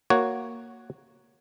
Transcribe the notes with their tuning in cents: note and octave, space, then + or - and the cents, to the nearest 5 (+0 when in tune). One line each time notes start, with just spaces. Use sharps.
A#3 +0 F#4 +0 C#5 +0